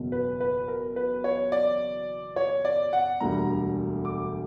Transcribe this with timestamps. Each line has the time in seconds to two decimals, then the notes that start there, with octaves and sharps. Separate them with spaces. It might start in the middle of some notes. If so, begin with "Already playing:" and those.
Already playing: F#1 E2 B2
0.12 B4
0.40 B4
0.68 A#4
0.96 B4
1.24 C#5
1.52 D5
2.36 C#5
2.65 D5
2.93 F#5
3.20 E1 D2 D3 G3 A#3 A#5
4.05 D6